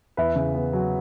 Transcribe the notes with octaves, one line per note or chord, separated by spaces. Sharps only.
E2 B4 E5
C#3
B3
F#3